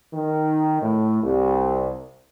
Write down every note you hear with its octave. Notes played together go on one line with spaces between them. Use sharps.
D#3
A2
C2